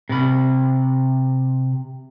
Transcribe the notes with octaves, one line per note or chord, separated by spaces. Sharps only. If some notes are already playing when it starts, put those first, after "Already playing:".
C3 B5